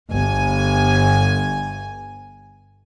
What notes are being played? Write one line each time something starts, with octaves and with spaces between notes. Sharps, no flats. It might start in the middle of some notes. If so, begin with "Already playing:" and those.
G1 G#5